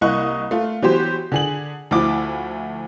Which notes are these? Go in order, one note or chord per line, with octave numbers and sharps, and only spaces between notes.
C2 A#3 E4 D#5 C#6 F#6
A3 F4
E3 F#3 B3 G4 C5
D3 G#4 F#7
D2 F3 E4 D6